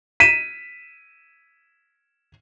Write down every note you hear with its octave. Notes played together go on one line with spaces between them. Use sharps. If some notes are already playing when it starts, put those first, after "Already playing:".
B6 D#7 E7